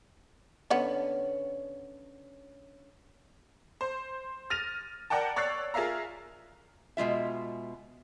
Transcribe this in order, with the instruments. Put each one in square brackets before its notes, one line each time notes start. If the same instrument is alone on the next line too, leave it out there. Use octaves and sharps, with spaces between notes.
[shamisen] D3 B3 F#5 [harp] C#4 D4 C#5
[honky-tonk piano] C5
F6 A6 A#6 D#7 F7
A#4 D5 F#5 G5 A5
C#5 D5 E6 F#6 A6 C7
F4 G#4 A#4 E5 F5 A#5
[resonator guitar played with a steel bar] B2 G#3 F4 E5